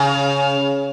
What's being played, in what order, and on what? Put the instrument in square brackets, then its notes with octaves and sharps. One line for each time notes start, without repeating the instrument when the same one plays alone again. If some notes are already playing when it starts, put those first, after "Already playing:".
Already playing: [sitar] C#3